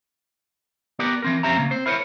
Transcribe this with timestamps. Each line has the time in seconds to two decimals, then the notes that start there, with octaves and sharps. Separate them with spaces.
0.99 B3 G4 A#4 D5
1.22 E3 C4 A#4
1.43 F2 C4 C#4 G4 E5 A#5
1.57 C#3 A#3
1.71 C4 C5
1.86 E4 A#4 C5 C#5